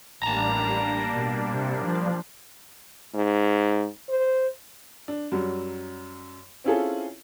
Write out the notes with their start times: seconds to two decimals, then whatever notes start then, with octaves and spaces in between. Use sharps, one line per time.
0.23 A1 G3 A#3 D4 A5 A#5
1.11 B2
1.53 C3
1.85 F3
3.15 G#2
4.10 C5
5.08 D4
5.32 F#2 F#3 G3
6.64 C4 C#4 E4 F4 G#4 A4